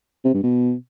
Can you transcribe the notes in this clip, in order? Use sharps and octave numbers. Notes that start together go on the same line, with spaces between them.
C3
G2
B2